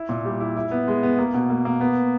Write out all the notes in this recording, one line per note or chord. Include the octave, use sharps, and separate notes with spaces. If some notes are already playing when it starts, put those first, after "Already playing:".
Already playing: E4
A#2
G3
E4
E4
B3
G#3
B3
A#3
B2
A#3
A#3
B3